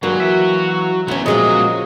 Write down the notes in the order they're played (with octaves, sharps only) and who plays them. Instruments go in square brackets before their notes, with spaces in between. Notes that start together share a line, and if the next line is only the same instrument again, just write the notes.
[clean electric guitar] G2 D#3 G#3 [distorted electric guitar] F#3 [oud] A#3 [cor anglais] F#4
[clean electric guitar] E3 E5
[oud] D2 C#4 [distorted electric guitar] F#3 B3
[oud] A#2 G#3 B3 [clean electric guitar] C#3 F3 A#3 [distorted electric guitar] F#3 [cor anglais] D#5